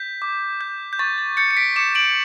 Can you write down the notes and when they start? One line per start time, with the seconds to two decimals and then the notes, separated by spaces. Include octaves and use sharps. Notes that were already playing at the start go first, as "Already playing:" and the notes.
Already playing: G6 B6
0.22 D6
0.61 G6
0.93 G6
0.99 C#6 A6
1.18 A6
1.37 G6 A6 C#7
1.51 C#7
1.57 B6 D7
1.76 D6 C#7 E7
1.95 D7 F#7